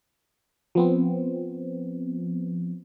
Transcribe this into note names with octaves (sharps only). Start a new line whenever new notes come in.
F3 B3 C4